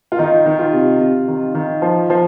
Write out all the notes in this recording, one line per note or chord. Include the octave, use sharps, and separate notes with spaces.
F4
D#3 D#4
D#3
F4
C3
C3
D#3
D#3
F3
F3